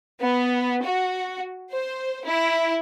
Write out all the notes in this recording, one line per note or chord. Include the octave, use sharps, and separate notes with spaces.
B3
F#4
C5
E4